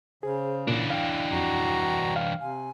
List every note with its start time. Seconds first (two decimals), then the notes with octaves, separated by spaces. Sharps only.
0.23 C#3 G#4 C5
0.67 A#2 E3 D4
0.90 F5 G5
1.32 F2 F#4 A#5
2.16 F5
2.40 C3 G#5